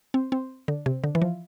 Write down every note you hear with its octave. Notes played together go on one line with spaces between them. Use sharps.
C4
C4
D3
C3
D3
E3
F3